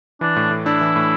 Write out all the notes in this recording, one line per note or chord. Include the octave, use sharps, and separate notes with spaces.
E3 D4
A2
A2
D4 E4
E3
A2